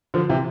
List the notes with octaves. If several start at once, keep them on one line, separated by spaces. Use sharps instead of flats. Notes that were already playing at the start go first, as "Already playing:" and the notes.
D3 F3
C3 E3